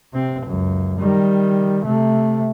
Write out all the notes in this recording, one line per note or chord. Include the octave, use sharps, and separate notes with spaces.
C3 C4
C#2 F#2
D#3 G3
C3 A3